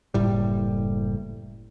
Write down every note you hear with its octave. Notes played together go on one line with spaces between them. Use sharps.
F#1 A2 G3